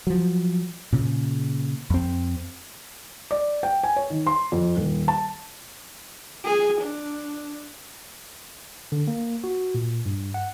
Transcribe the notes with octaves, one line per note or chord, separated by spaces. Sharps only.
F3 F#3
A#2 C#3
F2 C4
D5
G5
G#5
C#5
D#3
C6
F2
D#1
A5
G#4
D4
D3
A#3
F#4
A#2
G2
F#5